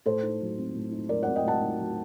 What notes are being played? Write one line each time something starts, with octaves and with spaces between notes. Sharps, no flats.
A2 A4 C5
D#4
F#3
C4
A2
D#4
F#3 A#4 D5
C4 D5 F#5
D#5 G5
A2 F#5 A5
D#4
F#3